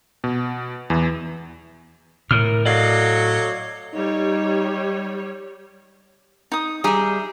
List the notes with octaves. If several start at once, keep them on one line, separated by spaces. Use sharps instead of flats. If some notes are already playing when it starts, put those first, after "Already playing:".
B2
E2 E3
A2 A#4 F6
F#3 F#4 A4 D5 D#5 F5
G3 D#4 C#5
D#4 D#6
G3 G#4 E5 A#5